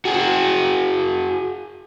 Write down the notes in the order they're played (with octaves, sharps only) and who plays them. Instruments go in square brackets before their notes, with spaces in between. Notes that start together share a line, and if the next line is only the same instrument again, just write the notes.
[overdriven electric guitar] F#4 G#4